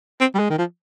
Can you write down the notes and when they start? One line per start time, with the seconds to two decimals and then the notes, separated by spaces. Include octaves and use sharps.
0.20 C4
0.35 G3
0.39 G#3
0.50 D#3
0.58 F3